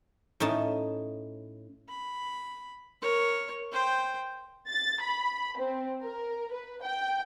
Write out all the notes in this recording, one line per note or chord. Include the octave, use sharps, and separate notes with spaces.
A2 C#4 D#4 A5
B5
A#4 C#5
C5 G5
A6
B5
C4
A#4
B4
G5